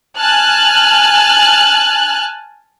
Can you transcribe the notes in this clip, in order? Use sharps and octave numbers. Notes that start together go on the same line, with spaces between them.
G#5 A5 F6 F#6